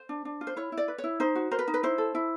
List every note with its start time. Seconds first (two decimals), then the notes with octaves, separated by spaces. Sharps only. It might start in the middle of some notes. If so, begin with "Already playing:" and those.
Already playing: C5
0.09 D4
0.25 D4
0.41 F4
0.47 C5
0.56 E4 C#5
0.72 E4
0.77 D5
0.88 B4
0.98 C#5
1.04 E4
1.20 D#4 C5
1.35 F#4
1.51 A#4 C5
1.59 B4
1.68 D#4
1.74 B4
1.83 E4 C5
1.98 A4
2.15 E4